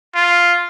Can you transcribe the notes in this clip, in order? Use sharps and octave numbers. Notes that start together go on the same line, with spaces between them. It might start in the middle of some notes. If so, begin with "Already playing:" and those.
F4